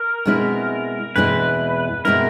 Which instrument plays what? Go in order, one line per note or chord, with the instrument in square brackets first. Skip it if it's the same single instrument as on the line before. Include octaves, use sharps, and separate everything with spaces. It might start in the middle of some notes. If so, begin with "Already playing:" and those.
Already playing: [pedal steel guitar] A#4
[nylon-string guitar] B2 G#3 C4 E4
[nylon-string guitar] E2 B2 G#3 C4 E4 [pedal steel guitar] B4
[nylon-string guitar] B2 G#3 C4 E4 [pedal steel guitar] A#4